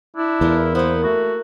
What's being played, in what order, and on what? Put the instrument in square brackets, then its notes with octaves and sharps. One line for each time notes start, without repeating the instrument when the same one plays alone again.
[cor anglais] D4 [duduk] E4
[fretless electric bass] E2 [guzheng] G#3 F4 A#4
[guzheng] A#3 E4 [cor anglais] B3 [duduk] C5
[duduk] A3 [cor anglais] F#4